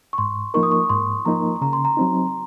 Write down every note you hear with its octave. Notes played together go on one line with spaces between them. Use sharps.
C#6
G#2 C6
F3 A#3 D#4 A#4 C#6
D#6
C#6
G#2 C6
F3 A#3 D#4 A#4 A#5
C#3 A#5
C6
A#5
F#3 C4 D#4